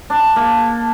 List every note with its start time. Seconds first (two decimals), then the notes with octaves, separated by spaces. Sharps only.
0.10 D4
0.36 A#3